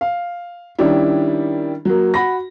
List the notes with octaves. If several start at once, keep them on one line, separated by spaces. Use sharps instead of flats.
F5
D#3 G3 C#4 D4 E4
F#3 A#3
F#4 B5 A#6